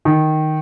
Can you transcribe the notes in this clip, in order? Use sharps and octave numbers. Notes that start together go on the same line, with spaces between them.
D#3